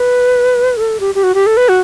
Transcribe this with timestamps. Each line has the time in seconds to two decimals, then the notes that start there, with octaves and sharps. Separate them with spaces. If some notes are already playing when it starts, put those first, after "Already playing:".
Already playing: B4
0.77 A4
1.00 G4
1.15 G4
1.23 F#4
1.35 G4
1.46 A4
1.57 B4
1.69 F#4